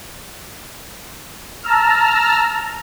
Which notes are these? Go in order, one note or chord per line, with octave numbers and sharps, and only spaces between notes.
A5 A#5 E6 F6